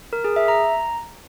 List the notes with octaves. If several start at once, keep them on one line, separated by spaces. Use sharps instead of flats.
A#4
G#4
E5
A#5